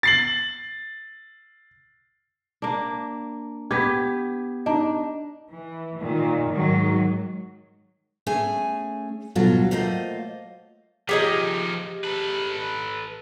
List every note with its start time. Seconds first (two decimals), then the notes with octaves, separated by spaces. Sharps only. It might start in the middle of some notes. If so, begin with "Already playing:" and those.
0.03 A6 C7 F#7
2.62 A#3 D4
3.71 B3 G4 G#6 B6
4.66 D4 D#4
5.50 E3
6.00 A#2 D#3
6.48 G#2 D#3 F#3
8.27 A3 C#4 G#4 G#5
9.35 D2 B2 F#3 F4 A4
9.71 F#3 A3 A#3 F4 C5 D#5
11.09 F3 D#4 G4 G#4 D#5
12.04 A4 B4